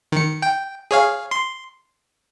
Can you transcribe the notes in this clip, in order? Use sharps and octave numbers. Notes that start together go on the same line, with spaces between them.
D#3 C#7
G5
G#4 C#5 F5
C6